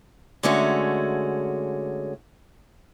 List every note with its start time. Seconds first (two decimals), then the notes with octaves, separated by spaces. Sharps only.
0.43 D3 G#3 A3 C#4 F#4